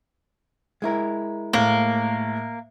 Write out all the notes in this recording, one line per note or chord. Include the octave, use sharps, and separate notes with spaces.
G#3 E4 A#4
A2 A#3